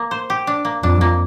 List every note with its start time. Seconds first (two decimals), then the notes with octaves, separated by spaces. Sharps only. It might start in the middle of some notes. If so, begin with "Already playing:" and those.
Already playing: A#3
0.11 C5
0.30 G4
0.47 D4
0.65 A#3
0.83 F2 D4
1.01 A#3